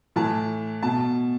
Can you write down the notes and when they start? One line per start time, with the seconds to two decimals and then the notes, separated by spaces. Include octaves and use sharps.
0.16 A2 E3 A5
0.83 B2 A5